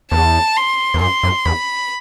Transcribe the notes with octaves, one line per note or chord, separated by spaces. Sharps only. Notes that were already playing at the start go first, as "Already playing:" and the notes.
E2 A5
C6
E2
F#2 C6
F#2
E2 B5